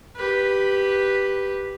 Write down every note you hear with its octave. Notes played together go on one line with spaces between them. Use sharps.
G4 B4